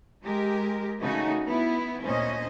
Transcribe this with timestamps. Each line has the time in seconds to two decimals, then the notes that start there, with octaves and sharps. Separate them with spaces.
0.23 G#3 G4 A#4
1.00 C#3 A3 D#4 F#4
1.46 B3 E4
2.03 D2 A#2 C#4 C5 D#5